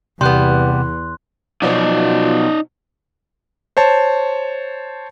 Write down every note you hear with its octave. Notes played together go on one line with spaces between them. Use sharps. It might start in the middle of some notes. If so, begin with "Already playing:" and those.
E2 C3 G3 B3 C6 F#6
B2 F3 F#3 D#4 D5
C5 C#5 A5